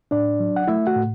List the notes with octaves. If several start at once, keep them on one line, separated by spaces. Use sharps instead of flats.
A2 D4 D5
F#3
F#5
A3 E4 E5
F#4 F#5
A2